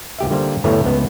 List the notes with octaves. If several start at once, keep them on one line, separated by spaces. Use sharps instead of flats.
C#2 G4 E5
D3 G3 A#3 C5
E2 G2 D3 E3 A3 C#5
C#2 B3